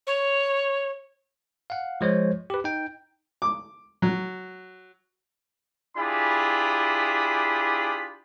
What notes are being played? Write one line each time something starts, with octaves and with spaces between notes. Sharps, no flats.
C#5
F5 F#5
F3 G#3 C5 C#5
G4 B4
D#4 G5
D6
F#3
D4 E4 F4 G4 G#4 B5